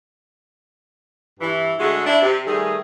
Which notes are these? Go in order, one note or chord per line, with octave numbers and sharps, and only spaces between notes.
G2 E3
D3 G#3 A3 E4 F#4 G#4
D4 E4
C3
D#3 G3 A3 G#4